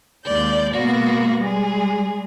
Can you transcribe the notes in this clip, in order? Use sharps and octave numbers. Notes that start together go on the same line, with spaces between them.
D#2 G#3 D5 G6
B2 G#3 A#3 B3 F#4 A#6
G3 G#3 G#4